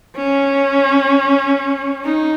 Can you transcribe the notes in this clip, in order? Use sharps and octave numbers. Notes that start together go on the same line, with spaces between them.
C#4
D#4